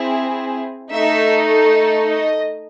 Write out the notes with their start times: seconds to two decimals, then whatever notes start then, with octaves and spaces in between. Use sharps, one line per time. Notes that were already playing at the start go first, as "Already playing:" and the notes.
Already playing: C4 E4 G#4
0.91 A3 D#4 A4 E5
2.13 D#5